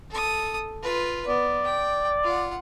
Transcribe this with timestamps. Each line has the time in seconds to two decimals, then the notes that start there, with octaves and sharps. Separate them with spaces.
0.10 A4 D#6
0.83 F4 B4
1.28 B3 D5
1.65 G5
2.24 F4 F#5